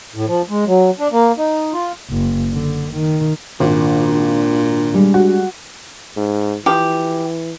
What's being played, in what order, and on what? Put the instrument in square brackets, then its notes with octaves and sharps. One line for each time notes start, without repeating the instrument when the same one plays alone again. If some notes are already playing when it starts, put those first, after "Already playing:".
[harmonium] A2
F3
G#3
F#3
D4
A#3
D#4
F4
[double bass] F#1
D3
D#3
[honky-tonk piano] G#1 [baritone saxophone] A#2 [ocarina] D4
[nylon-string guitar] G3 G#3
[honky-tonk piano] F#4
[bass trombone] G#2
[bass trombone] E3 [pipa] F3 G4